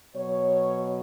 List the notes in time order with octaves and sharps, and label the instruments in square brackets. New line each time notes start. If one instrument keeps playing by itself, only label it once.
[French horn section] B2 F#3 C#5